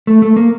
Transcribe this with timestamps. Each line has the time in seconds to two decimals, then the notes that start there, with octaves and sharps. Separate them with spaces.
0.07 A3
0.22 A3
0.36 A#3